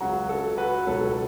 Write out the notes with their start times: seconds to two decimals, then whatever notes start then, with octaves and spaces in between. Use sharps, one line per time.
0.01 C#2 C#3 F#3 F#4
0.29 A4
0.57 F#4 B4
0.87 C#2 B2 F#3 A4 C#5